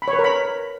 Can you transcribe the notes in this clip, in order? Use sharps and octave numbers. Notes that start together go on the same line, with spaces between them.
B5
C#5
B4
A#4
B5